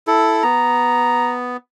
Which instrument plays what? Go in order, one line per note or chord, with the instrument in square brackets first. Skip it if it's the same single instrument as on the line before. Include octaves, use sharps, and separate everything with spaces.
[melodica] E4 A4
[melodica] B3 [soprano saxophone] A#5